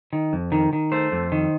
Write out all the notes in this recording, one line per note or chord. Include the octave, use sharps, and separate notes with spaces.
D#3
F2
D#3
D#3
A3 C5
F2
D#3